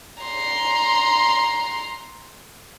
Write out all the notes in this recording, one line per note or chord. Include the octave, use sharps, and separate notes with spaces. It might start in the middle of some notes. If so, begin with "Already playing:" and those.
A#5 C6